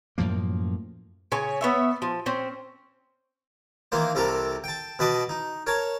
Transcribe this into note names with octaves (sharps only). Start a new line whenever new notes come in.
F#2 A2 F3 A#3
C#3 C#5 G#5
B3 C#5 E5
F3
C4 C#4
D#3 E3 A#3 C5
C2 C3 G4 A4 A#4
G5 A5
B2 B4 D#5 A5 D6
D#4
A#4 C#5 A5